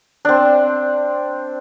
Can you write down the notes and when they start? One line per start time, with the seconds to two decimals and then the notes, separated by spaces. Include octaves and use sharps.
0.25 C4 D4